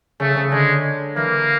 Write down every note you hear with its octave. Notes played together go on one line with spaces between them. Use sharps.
C#3 A3
C#3
D3 G#3
E3 A#3